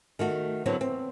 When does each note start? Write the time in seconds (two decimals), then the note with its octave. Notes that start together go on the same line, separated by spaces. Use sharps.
0.19 D#3 A3 F#4
0.66 D3 F#3 B3 C4 E4
0.81 C4